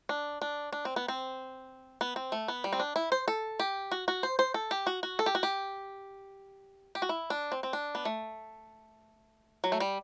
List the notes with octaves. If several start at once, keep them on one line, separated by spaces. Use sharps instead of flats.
D4
D4
D4
C4
B3
C4
B3
C4
A3
B3
G3
C4
D4
E4
C5
A4
G4
F#4
F#4
C5
C5
A4
G4
F#4
F#4
A4
G4
F#4
G4
G4
F#4
E4
D4
C4
C4
D4
B3
A3
F#3
A3
G3